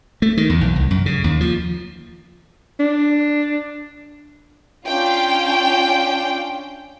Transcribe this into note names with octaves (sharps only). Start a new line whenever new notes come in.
A3
D#3
E2
B1
C2
F#2
C#3
D#2
F3
D4
C#4 D4 F4 G5